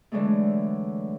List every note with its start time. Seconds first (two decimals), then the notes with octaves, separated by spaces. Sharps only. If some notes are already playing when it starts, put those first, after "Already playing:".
0.12 D3 E3 F#3 G#3 A3